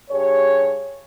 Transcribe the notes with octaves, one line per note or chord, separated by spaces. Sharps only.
G2 G4 G#4 C#5